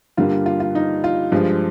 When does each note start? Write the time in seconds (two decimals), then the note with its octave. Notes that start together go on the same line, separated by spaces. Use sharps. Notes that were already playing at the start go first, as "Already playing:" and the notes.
0.17 G2 D3 G3 A#3 F4
0.46 F4
0.60 F4
0.75 D#4
1.04 F4
1.32 G2 F3 G#3